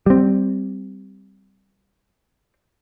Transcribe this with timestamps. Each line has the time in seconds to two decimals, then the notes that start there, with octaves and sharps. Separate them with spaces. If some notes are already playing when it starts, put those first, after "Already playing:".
0.06 G3 C4